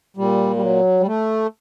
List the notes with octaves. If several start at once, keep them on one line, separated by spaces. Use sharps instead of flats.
A#2 G3
G3
F#3
G3
A3